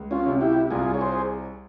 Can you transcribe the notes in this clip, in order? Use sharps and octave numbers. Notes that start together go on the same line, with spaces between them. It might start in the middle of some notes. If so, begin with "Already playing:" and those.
Already playing: C#2
C#4 F4
C3
E4 G4
C2 F4 G#4
C#5
G#4 C5